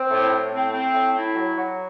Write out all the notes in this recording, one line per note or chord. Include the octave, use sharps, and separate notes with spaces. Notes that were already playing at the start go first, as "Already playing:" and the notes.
Already playing: C4
A2
A2
C4
C4
A2
E4
F#3
F#3